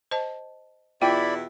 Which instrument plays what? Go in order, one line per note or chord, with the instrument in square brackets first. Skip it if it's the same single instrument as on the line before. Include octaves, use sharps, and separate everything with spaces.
[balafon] C5 D#5 A5
[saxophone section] E2 B2 E4 [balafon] F4 [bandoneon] D5 B5 [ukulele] G5